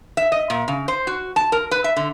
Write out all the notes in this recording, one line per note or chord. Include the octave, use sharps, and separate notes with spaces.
E5
D#5
A#2
C#3
C5
F#4
A5
A#4
B4
E5
D3